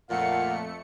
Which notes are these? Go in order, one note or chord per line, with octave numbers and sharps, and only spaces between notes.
F2 A#2 A3 F5 F#5 C#7